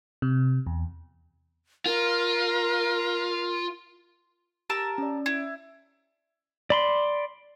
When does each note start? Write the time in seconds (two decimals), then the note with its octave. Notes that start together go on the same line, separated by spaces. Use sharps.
0.22 C3
0.67 E2
1.86 F4 A#4
4.70 G4 A#4 A5 E6
4.98 C#4 D5
5.26 E4
6.70 D5 B5 C6